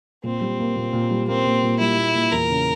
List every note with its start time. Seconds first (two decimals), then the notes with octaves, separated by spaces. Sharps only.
0.24 A#2 C4
0.41 G3
0.59 A#3
0.76 A#2
0.93 A#2
1.11 G3
1.28 A#3 C4
1.46 A#2
1.63 A#2
1.79 G3 E4
1.97 A#3
2.15 A#2
2.32 E2 A#4
2.50 C#3